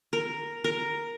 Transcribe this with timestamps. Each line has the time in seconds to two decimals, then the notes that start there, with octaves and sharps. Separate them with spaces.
0.13 A#4
0.64 A#4